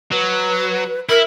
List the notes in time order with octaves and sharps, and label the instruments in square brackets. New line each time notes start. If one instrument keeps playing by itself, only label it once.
[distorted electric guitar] F#3 [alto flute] B4
[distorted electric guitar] E4 [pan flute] A#4 [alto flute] E5